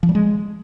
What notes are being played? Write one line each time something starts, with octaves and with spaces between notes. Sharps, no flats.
F3
G3
G#3